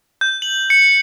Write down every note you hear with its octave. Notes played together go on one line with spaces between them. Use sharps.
G6
F#7
C#7